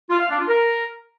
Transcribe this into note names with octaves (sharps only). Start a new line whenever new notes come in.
F4
F5
D4
F4
A#4